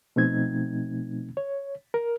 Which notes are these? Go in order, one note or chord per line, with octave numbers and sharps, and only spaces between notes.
B2 F3 A3 C4 D#4 G#6
C#5
A#4